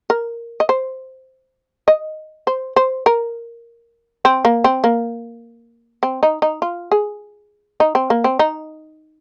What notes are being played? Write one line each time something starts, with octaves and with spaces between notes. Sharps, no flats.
A#4
D#5
C5
D#5
C5
C5
A#4
C4
A#3
C4
A#3
C4
D#4
D#4
F4
G#4
D#4
C4
A#3
C4
D#4